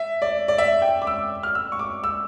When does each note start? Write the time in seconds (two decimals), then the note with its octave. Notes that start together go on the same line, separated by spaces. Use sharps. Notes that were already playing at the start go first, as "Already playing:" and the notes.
Already playing: E5
0.22 D5
0.48 D5
0.58 E5
0.82 G5
1.02 D6
1.07 E6
1.43 F6
1.55 E6
1.72 C#6
1.79 D6
2.04 E6